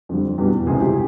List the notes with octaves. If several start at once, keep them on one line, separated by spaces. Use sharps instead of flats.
F2 D3 G3
E2 B2 G3 B3 D4
C#2 C3 E3 G#4
G4